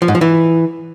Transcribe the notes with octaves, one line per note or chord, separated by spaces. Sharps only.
F3
G#2
F3
E3